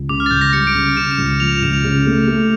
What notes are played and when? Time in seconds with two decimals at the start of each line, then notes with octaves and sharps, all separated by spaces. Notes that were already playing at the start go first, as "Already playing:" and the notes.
Already playing: C#2
0.09 C#3 D6
0.20 F6
0.26 A6
0.31 C#2 G6
0.41 A#6
0.53 G3 C#7
0.67 D7
0.75 C#3
0.97 C#3 E7
1.11 E7
1.18 C#2
1.26 E7
1.40 F3 F7
1.51 E7
1.62 C#2 E7
1.73 F7
1.84 C#3
2.07 A3
2.28 A3